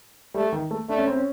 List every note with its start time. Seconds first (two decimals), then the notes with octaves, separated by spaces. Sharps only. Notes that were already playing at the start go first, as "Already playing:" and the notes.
0.34 G3 A3
0.53 D#3
0.71 A3
0.89 A3 D4
0.98 C#4
1.08 C4
1.16 C#4